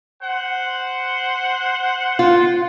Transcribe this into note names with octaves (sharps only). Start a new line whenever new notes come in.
C5 F#5
F4